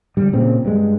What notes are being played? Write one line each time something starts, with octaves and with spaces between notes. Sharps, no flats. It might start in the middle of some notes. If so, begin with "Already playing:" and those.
D3 G3
A#2 C#3 C4
G2 G#3